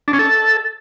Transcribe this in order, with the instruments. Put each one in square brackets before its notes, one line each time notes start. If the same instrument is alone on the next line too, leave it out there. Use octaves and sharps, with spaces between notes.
[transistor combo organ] D4
C#4
A4